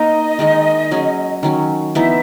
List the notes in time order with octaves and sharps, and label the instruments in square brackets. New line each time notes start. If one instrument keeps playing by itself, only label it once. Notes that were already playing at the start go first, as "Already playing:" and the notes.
Already playing: [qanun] A#3 D#4 A#4 [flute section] D#5
[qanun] D#3 G#3 D#4
F#3 C#4 G#4
D#3 F#3 C#4
[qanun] E3 B3 D#4 [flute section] E5